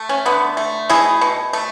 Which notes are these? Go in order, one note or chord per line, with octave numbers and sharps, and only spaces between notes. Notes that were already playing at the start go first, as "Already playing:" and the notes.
Already playing: A3
C#4
D3 B3
A3
B2 E4 G#4
B2
A3